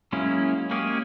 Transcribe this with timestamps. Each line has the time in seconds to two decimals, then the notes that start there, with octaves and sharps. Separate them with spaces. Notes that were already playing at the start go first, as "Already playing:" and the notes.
0.12 F#3 G#3 A#3 C#4 E4
0.71 G#3 A#3 C#4 G4 G#4